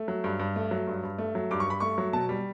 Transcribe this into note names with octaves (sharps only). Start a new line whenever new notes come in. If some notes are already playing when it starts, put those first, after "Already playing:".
Already playing: A3
F#3
G2
G2
A3
F#3
G2
G2
A3
F#3
G2 D6
C#6
G2 B5
A3 C#6
F#3
B2 A5
G3